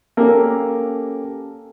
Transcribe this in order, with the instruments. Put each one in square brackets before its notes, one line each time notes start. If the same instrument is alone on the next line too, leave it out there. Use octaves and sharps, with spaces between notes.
[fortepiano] A#3 [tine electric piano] C#4 G4 A4